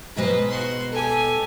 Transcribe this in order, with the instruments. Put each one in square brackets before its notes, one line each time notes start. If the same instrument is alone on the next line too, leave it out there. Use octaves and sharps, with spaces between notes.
[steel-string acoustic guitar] G#2 B2 G#3 [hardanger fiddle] B4 C5
[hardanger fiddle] F#4 C6
[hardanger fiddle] G4 G#5 [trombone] A4